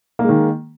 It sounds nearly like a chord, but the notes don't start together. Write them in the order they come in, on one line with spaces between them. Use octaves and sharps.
A#3 G#3 D#3